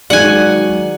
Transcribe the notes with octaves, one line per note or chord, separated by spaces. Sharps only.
D#3 F#3 G#3 D5 F#5 G#5